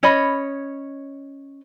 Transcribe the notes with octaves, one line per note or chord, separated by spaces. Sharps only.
C#4 C#5 D#5 B5